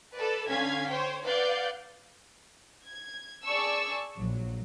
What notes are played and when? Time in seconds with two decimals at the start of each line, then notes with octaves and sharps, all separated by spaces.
0.13 A4 B4 D5
0.47 D3 C#4 F5 G#6 B6
0.89 C5 C#5 G5
1.24 B4 D5 F5 F#5 G6
2.86 G#6
3.45 G#4 D5 A5 C#6 E6
4.16 A#1 F#3